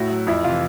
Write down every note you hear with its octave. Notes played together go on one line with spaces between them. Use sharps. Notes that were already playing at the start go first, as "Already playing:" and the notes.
Already playing: A2 E4 F#4
F#3
F2 E4
C3 E3 F4